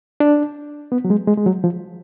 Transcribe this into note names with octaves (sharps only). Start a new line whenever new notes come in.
D4
B3
F#3
G#3
G#3
G#3
F#3
F3